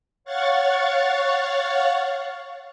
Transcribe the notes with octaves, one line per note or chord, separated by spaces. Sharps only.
C#5 F5 F#5 C#6 A6